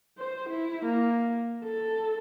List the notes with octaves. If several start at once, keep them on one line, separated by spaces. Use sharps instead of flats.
C5
E4
A#3
A4